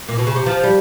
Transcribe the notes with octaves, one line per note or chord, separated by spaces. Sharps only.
A#2
B2
C#3
C3
F3
G3